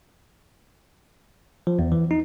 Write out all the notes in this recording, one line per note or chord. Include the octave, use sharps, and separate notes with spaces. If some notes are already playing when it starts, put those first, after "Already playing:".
F3
E2
E3
D#4